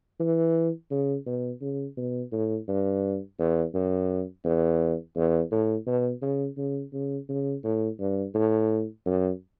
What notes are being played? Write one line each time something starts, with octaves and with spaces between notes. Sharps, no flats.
E3
C#3
B2
C#3
B2
A2
G2
E2
F#2
E2
E2
A2
B2
C#3
C#3
C#3
C#3
A2
G2
A2
F#2